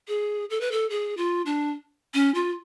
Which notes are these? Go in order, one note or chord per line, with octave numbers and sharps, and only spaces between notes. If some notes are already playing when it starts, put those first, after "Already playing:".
G#4
A4
B4
A4
G#4
F4
D4
C#4
F4